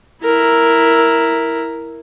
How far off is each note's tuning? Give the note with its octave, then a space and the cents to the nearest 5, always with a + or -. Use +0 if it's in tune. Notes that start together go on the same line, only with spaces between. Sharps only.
E4 +0 A#4 +0